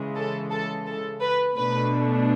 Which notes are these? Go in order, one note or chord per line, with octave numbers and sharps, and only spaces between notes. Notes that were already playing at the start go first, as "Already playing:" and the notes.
Already playing: C#3 E3 G#3
A4
A4
A4
B4
B2 A3 D4 B4